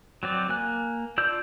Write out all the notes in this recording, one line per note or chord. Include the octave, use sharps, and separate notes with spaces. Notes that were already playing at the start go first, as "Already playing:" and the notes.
F#3 C4 D5
A#3 G#5 F#6
D4 F4 D5 E6 G6